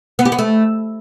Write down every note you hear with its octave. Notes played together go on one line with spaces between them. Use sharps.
B3
G4
B3
A3